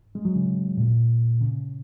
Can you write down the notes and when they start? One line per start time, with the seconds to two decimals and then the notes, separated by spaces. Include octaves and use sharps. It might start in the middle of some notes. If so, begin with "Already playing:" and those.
0.15 G#3
0.25 F#3
0.36 C#3
0.77 A#2
1.41 C#3